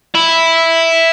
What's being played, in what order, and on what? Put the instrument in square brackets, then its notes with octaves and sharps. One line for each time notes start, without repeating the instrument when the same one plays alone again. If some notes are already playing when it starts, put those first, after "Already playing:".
[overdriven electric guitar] E4